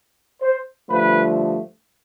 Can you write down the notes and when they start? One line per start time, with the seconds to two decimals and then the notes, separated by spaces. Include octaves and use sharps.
0.41 C5
0.90 G2 D3 F3 A3 B4